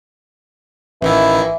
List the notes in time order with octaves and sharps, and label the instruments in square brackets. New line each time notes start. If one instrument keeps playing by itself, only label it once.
[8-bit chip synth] A1 D#3 E4 [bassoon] E3